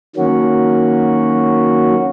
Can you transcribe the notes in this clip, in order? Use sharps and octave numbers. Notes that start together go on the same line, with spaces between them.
D#3 F#3 A#3 C#4 F#4